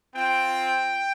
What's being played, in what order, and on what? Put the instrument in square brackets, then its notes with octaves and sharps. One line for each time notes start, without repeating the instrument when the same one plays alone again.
[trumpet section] C4 F4 G5